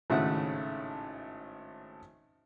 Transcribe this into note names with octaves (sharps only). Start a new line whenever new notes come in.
G#1 A2 C#3 A3 E5 F#5